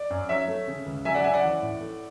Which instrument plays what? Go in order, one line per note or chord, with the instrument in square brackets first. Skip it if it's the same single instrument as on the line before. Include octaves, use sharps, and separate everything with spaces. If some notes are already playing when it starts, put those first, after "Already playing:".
Already playing: [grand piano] D5
F#2
F#3 C#5 E5
A3
C#3
C#2
F#3 E5 G#5
D5 F#5
C#4 E5 G#5
D5 F#5
E3
A2
A3